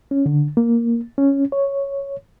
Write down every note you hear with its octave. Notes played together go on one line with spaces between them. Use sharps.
C#4
D3
A#3
C#4
C#5